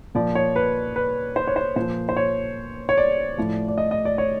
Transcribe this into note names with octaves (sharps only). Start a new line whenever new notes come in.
A#2 F3 D5
C#5
B4
B4
C5
C#5
C5
A#2 F3 C5
C5
C#5
C#5
D5
A2 F3
D5
D#5
D#5
D5
C#5